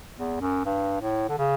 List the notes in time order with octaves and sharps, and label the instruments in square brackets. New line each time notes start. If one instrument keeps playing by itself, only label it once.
[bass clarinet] E2
F#2
G2
A2
D3
C#3